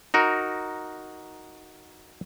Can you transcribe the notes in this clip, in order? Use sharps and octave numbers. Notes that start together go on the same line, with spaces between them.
D#4 F#4 A#4